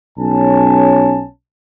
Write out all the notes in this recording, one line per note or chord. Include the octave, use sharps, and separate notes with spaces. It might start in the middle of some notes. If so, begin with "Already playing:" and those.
B1 C#4 C#5 G#5 A5